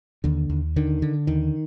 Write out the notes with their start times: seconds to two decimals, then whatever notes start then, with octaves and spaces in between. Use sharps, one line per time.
0.24 D#2 D3
0.49 D#2
0.76 D3 D#3
1.02 D3
1.27 D#2 D#3